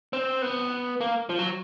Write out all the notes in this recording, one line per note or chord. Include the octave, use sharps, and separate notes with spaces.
C4
B3
A#3
F3
F#3